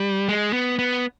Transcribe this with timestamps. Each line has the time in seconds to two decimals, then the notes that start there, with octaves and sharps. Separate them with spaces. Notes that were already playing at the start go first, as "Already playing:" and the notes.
Already playing: G3
0.29 G#3
0.53 B3
0.79 B3